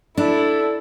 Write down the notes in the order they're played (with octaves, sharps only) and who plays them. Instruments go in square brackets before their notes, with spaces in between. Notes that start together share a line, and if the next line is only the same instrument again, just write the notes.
[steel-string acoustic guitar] D4 [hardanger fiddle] E4 [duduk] A4